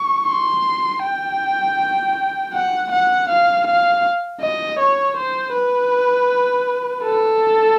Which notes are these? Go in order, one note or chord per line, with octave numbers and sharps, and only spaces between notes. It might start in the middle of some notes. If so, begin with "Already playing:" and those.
Already playing: C#6
C6
G5
F#5
F#5
F5
F5
D#5
C#5
C5
B4
A4